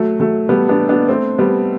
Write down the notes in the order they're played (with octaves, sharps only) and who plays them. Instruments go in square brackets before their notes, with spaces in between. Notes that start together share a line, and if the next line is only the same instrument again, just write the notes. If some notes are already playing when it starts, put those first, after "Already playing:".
Already playing: [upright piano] F#3 A3
F#3 A3
G3 B3
B3 D4
B3 D4
A3 C4
G3 B3